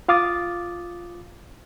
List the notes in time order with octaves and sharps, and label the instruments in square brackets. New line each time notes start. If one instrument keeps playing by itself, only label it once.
[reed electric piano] F4 F5 D6 D#6 A6